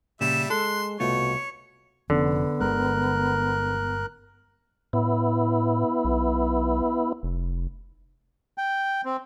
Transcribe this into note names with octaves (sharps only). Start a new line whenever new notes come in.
A#2 C#3 G3 E5 E7
G#3 A4 C6 F#6
C2 B2 A3 F4 C#5 C#7
F1 D3 F3 B3 C#4
G1 G#3 A#4 F#6
A2 B3 E4
B1
F1
G5
C4